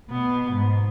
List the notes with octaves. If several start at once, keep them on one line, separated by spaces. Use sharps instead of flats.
B2 B3
G#2